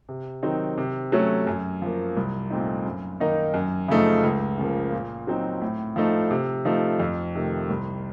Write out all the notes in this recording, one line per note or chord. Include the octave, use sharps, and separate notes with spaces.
C3
D#3 F#3 C4 D#4
C3
F#3 A3 C#4
F#2
F3 A#3
C2
A#2 A3 C4 D#4
F#2
D#3 A#3 D#4
F#2
C#3 F3 A3 D#4
C#2
C#3 F3 A#3
A#2
F#3 C4 D#4
A2
F3 A3 D#4
C3
F3 A3 D#4
F2
C3 D#3 A3
C2